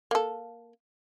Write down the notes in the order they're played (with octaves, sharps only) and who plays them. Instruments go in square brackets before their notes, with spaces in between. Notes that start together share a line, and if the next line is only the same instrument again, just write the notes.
[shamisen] A#3 A4